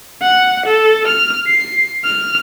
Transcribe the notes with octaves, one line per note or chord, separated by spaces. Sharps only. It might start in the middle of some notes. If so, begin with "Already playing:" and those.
F#5
A4
F6
C7
F6